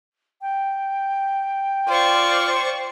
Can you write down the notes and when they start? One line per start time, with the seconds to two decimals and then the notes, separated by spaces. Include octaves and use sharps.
0.41 G5
1.89 F4 C5 D5 C#6